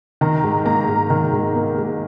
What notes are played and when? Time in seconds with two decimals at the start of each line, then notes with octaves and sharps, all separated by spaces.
0.21 D#3 A#5
0.44 G#2
0.65 A#3 A#5
0.89 G#2
1.10 D#3
1.32 G#2
1.55 A#3
1.78 G#2